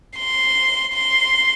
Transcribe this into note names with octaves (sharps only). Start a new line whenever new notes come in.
C6
C6